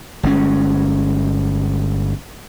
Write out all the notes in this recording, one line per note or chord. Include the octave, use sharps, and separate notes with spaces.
G1 G#3 C#4